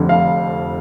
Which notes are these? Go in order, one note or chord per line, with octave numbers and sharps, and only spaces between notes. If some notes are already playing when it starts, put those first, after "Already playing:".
Already playing: F1 F2 D3
F5